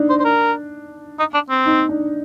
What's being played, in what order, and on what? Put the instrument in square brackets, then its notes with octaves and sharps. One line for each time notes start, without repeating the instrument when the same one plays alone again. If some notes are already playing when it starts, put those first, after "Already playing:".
Already playing: [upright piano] D4 D#4
[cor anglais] C5
C5
A#4
D#4
D4
C4
[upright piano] D#4
D4